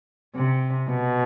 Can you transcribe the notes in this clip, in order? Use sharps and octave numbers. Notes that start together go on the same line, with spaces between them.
C3
B2